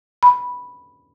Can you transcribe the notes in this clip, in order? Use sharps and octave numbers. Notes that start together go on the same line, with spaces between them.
B5